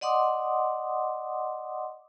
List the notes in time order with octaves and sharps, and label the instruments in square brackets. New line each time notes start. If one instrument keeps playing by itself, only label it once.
[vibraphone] D5 D#5 F#5 C6 D6 D#6